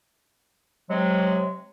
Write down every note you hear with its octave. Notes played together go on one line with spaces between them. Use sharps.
C3 F#3 G#3